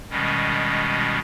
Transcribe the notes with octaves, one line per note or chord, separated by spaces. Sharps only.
B2 D#3 G3 G#3 C#4